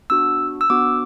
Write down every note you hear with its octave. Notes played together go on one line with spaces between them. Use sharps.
B3 D4 F#4 E6
E6
B3 D4 F#4 D6